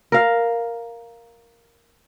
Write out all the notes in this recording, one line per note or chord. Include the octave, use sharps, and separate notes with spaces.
A#4 F5